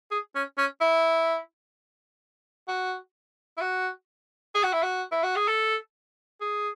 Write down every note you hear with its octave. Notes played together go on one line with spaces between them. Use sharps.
G#4
C#4
C#4
E4
F#4
E4
F#4
G#4
F#4
E4
F#4
E4
F#4
G#4
A4
G#4